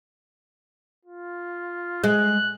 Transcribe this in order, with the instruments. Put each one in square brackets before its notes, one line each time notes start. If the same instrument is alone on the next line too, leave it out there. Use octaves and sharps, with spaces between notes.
[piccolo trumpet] F4
[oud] G#3 [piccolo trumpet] F#6